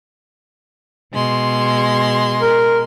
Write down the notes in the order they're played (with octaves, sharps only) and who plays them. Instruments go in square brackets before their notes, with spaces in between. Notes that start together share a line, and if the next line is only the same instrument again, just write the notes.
[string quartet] B2 G#3 C6
[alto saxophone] A#4